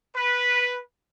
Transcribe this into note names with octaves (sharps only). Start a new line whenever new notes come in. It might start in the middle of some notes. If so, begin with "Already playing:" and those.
B4